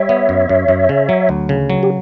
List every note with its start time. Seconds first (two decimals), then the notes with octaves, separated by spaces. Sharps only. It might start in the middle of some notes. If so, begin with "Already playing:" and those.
Already playing: G3 C#5 E5
0.09 B3
0.29 F#2
0.49 F#2
0.68 F#2
0.89 C#3
1.09 F#3
1.29 D2
1.49 C#3
1.70 F#3
1.83 G4